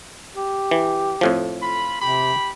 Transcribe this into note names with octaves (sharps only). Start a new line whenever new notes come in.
G4
E3
F2 A2 F3
F4 B5
C3 G4 B5